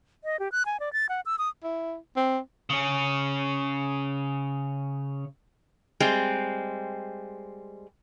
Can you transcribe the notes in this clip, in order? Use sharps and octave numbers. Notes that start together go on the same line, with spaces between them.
D#5
G4
F#6
G#5
D5
A6
F#5
E6
D#6
E4
C4
C#3 C#4
G3 G#3 C4